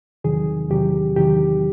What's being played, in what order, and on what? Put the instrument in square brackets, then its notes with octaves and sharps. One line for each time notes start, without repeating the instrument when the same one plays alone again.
[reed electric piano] E2 C3 D#3 F#3 G#4
E2 C3 D#3 F#3 G4
E2 C3 D#3 F#3 G4